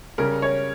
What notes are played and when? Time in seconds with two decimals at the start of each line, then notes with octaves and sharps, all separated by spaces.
0.18 C#3 G3 C#4 A#4
0.42 C#5